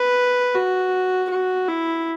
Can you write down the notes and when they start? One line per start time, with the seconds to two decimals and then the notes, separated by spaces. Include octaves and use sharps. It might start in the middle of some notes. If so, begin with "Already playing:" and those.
Already playing: B4
0.55 F#4
1.30 F#4
1.68 E4